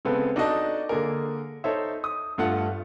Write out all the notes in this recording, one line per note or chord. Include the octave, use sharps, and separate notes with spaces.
C#3 G#3 B3 C4 A4 B4
D4 D#4 F#4 A4 D#5 A5
D3 A#3 G#4 A#4
D#4 A4 C5 C#5 E5
D#6
G2 A3 F4 F#5